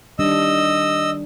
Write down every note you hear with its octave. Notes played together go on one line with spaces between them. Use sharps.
D#3 G3 D4 D#5 E6